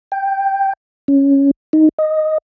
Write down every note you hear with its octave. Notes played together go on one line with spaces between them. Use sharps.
G5
C#4
D#4
D#5